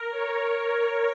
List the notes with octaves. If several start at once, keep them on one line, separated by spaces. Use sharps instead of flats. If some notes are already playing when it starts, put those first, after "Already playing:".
Already playing: A#4
C#5